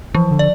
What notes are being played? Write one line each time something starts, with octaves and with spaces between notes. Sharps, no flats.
E3 F3
D3
D5